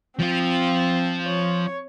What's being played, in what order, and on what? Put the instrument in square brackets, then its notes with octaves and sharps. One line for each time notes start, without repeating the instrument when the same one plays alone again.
[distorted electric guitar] F3 F4 [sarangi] C4
[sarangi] C#5